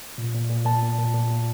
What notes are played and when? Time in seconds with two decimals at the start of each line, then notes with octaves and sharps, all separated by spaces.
0.18 A#2
0.34 A#2
0.50 A#2
0.65 A#2 A5
0.83 A#2
0.99 A#2
1.14 A#2
1.31 A#2